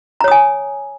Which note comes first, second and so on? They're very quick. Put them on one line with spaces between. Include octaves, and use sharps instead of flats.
A#5 C#5 D#6 G#5